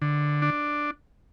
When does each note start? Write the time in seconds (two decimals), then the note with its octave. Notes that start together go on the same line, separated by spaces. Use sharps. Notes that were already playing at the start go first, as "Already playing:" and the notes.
0.02 D3
0.42 D4